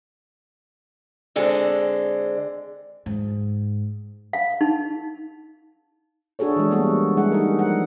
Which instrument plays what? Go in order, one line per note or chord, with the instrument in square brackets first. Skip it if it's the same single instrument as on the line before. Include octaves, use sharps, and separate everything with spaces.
[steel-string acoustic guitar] D3 G#3 C4
[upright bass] G#2
[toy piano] F5
D#4
[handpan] D4 F#4 G#4 A4 C#5
E3 G#3
G3 A#3 B3 F#4 A4
G3 G#3 E4 G#4 F#5
D#4 A4 A#4
F3 F#5